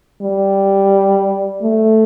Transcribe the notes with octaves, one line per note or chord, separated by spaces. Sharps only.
G3
A3